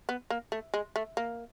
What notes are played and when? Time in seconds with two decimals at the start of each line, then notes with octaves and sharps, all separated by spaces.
0.09 B3
0.30 A#3
0.52 A3
0.74 G#3
0.96 A3
1.17 A#3